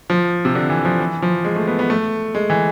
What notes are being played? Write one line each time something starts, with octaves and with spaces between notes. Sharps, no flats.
F3
C3
D3
E3
F3
E3
F3
G#3
A3
B3
B3
A3
G#3
E3